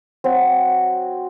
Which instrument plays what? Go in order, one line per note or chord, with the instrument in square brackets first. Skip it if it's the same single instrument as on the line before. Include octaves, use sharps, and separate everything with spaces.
[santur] F#3 C4 F#4